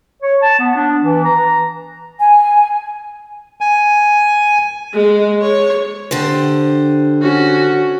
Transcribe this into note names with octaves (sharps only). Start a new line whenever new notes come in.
C#5
A5
B3
D4
E3
A#5
G#5
G#5
G#3
C#5
D3 G4 C5
C#4 F#4